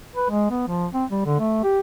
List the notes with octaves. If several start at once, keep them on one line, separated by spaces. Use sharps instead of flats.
B4
G#3
B3
F3
C4
G3
D3
A3
G4